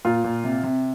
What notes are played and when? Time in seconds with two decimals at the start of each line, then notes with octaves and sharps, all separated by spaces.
0.05 A#2 F4
0.24 A#2
0.44 C3
0.63 C3